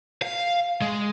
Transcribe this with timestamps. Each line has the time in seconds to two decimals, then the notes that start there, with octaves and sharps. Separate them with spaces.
0.22 F5
0.82 G#3